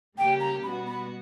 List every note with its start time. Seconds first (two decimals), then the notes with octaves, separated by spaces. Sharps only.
0.18 C#3 G3 A#3 C#4 G4 G5
0.40 A#5
0.63 B2 G3 B3 F#4 B5
0.86 B5